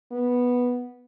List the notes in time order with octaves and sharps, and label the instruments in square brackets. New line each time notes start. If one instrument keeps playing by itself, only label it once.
[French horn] B3